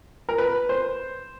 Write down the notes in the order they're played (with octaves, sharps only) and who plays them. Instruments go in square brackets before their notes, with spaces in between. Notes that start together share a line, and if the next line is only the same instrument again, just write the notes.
[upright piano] A#4
B4
C5